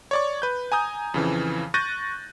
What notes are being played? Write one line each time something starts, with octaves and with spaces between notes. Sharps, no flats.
C#5 D5 C#6
B4 G6
G#5 A#5 D#6 G6
F2 C#3 E3
C#6 F#6 G6 A6 A#6 D#7